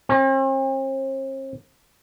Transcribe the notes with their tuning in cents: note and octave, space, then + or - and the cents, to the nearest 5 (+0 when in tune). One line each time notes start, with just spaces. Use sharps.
C4 +45